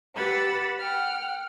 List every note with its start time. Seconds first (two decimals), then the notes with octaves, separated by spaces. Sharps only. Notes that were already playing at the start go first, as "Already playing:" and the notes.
0.16 G4 B4 F#5 B5 E6 A6
0.78 F#5 G5 F6